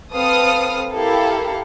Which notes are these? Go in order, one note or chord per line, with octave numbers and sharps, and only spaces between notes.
C4 A4 B4 F5 D#6 F6
E4 G4 A4 A#4 F5